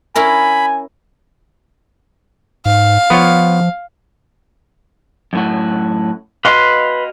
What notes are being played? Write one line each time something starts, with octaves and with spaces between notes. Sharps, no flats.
C#4 E4 A#4 G#5 B5
G#2 F5
F3 B3 F4 C#5
F#2 A2 F#4
F#4 B4 D#5 F5 C6